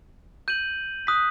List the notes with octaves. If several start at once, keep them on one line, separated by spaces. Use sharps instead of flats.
G6 D#7 F#7
D#6 F#6 B6